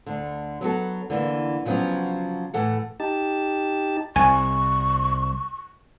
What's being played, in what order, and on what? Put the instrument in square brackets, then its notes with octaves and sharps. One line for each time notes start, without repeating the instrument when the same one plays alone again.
[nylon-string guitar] D2 D3
F#3 B3 F#4 A4
D3 E3 G#3 A#3
C#3 F3 F#3 G#3 B3 C#4
A2 E3 A4 F#5
[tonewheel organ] D#4 G4 A5
[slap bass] C2 [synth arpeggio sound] G#5 [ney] C#6